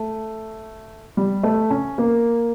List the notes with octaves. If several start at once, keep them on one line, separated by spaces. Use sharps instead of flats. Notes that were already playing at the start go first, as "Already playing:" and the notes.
Already playing: A3
G3
A3
C#4
A#3